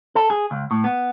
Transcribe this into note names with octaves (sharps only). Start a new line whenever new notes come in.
A4
G#4
C#2
A2
B3